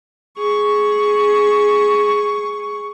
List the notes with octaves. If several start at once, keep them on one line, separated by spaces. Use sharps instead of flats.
G#4 C#6